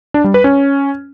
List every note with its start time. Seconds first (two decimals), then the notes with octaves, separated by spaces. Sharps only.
0.14 D4
0.24 G3
0.34 B4
0.44 C#4